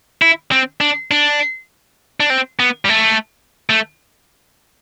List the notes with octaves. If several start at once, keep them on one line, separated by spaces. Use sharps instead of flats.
E4
C4
D4
D4
D4
C4
B3
G3
A3
A3